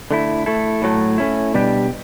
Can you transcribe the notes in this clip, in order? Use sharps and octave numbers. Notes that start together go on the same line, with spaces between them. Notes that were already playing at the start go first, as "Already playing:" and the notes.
D3 A3 E4
A3 E4 A4
A2 F#3 A3
A3 C#4 E4
B2 G3 D4 G4